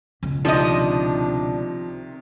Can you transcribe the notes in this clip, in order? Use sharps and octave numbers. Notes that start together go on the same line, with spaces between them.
C#2 B2
C3 D#3 F3 D4 D#5